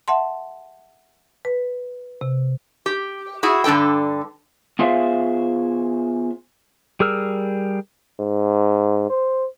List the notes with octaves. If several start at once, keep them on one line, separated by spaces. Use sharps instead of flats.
E5 F#5 A5 C6
B4
C3
G4
E4 F#4 G#4
G2 D3 D4 A4 G5
B3 F4 G#4 C5 E5 F5
G3 G#4 A#4 E6 F6
G#2
C5